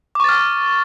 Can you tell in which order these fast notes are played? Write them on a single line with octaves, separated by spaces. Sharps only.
D6 C#6 A6 F6